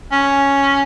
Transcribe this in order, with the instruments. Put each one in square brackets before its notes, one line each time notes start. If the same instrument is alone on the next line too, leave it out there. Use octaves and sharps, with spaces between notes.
[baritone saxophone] C#4